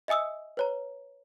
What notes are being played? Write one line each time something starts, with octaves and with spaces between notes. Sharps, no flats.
D#5 E5 G#5 D#6 E6
B4 C#5 A#5